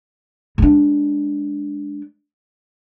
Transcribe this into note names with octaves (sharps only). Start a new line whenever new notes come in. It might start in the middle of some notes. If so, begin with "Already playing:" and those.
G#3 D4